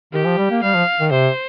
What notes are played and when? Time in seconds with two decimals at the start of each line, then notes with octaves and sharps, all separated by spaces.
0.13 D#3 G4
0.25 F3
0.38 G3
0.51 A#3
0.63 G3 F5
0.75 F3
1.00 D#3
1.12 C3 C5